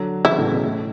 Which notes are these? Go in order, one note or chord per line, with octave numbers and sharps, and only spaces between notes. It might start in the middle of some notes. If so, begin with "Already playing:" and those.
Already playing: D3 F#3
C#3 E3 E4
A2 C#3
B2
A2